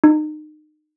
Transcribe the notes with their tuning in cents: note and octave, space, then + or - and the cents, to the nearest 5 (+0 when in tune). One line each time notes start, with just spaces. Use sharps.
D#4 -30